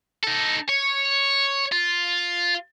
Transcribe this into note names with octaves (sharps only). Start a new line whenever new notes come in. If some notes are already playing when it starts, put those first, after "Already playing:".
D#4 A4
C#5
F4